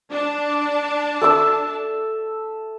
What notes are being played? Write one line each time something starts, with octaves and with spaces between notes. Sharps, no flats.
D4 A5
A4 E5 E6